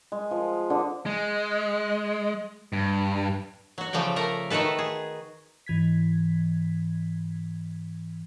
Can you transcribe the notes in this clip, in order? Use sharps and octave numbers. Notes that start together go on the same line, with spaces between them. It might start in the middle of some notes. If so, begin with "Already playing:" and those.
G#3
F3
D3
G#3
G2
F#3 F#4
C#3 F3 A3 D5 G5
A3 A#4
D#3 A3 F#4 A4 B4
G#4
G#2 E3 G#6 B6